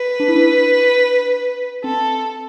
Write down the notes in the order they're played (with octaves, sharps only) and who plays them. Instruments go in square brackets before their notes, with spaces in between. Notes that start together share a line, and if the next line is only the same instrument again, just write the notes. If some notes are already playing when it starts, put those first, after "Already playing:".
Already playing: [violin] B4
[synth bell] D4
E4
D4
[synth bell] C4 [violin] A4